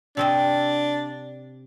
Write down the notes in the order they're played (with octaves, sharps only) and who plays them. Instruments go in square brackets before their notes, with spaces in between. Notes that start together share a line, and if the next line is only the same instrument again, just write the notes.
[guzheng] C3 C4 D#5 [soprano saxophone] D4